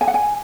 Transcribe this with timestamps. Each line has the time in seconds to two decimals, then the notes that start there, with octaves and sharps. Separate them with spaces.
0.01 G#5
0.08 F#5
0.14 G#5